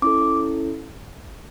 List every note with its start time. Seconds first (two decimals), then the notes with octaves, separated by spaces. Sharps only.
0.02 C#4 E4 A4 D6